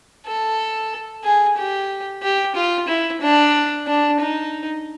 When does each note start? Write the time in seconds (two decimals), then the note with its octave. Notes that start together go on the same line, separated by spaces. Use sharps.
0.26 A4
1.24 G#4
1.57 G4
2.22 G4
2.55 F4
2.88 E4
3.21 D4
3.87 D4
4.20 D#4